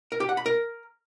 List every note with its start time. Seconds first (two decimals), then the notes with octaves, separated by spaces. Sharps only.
0.12 A#4
0.20 G4
0.29 F#5
0.37 B5
0.46 A#4